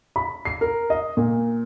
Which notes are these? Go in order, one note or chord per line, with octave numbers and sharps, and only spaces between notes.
B5
C7
A#4
D#5
A#2